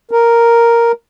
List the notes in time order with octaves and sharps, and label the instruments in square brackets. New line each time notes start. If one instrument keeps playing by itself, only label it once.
[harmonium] A#4